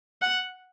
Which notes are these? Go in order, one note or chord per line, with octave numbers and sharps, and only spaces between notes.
F#5